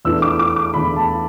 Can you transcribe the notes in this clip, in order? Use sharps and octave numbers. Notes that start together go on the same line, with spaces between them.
E2 E3 A3 D4 E6
D6
D6
D6
E2 E3 A3 D4 B5
A5